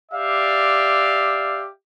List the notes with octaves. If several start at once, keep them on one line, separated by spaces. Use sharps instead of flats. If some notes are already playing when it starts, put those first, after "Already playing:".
G4 D5 E5 F5